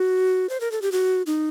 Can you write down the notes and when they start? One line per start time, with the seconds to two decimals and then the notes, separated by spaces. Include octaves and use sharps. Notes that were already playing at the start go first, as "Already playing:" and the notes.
Already playing: F#4
0.49 C5
0.61 A#4
0.72 A4
0.82 G4
0.92 F#4
1.26 D#4